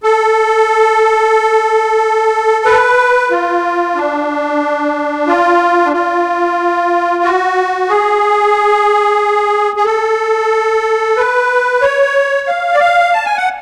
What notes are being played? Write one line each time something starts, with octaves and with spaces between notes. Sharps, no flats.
A4
B4
F4
D4
F4
D4
F4
F#4
G#4
G#4
A4
B4
C#5
F5
D5
F5
A5
G#5
F#5